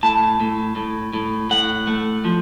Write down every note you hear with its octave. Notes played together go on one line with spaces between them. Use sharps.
A2 A5
A2
A2
A2
A2 F#5
A3
F3